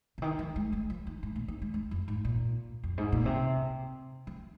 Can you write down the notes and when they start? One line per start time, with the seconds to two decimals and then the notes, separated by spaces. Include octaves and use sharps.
0.18 C3
0.22 D#3
0.39 F3
0.56 G#3
0.72 G#3
0.90 F3
1.07 D#3
1.23 G#2
1.36 A#2
1.48 D#3
1.62 G#3
1.74 G#3
1.91 F2
2.08 G#2
2.25 A#2
2.84 F2
2.98 G#2
3.12 A#2
3.26 C3
4.27 F3